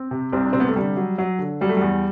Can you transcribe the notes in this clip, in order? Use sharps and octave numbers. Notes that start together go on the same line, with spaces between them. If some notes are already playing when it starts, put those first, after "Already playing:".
Already playing: C4
C3
C2 C4
D4
C3 C4
B3
A3
D3 G3
F#3
F#3
D3
F#3 G3
A3
E2 G3